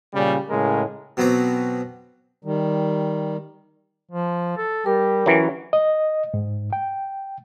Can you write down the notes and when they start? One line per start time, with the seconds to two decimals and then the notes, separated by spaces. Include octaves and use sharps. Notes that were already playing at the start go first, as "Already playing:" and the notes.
0.14 A#2 C#3 G3
0.49 A2 C#3 G#3 A#4
1.17 B2 F#3 B3 C4 A#5 D6
2.45 D#3 G3
4.12 F3
4.57 A4
4.86 G3 G4 A#4
5.26 E3 F#3 C#4
5.73 D#5
6.34 G#2
6.73 G5